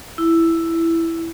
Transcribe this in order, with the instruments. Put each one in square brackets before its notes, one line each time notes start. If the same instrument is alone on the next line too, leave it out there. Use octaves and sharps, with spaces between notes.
[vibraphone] E4